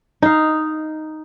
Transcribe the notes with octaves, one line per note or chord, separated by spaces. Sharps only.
D#4 F5